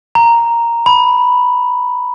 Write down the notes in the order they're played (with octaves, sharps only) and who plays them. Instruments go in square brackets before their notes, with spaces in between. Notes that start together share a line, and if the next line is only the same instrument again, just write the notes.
[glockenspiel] A#5
B5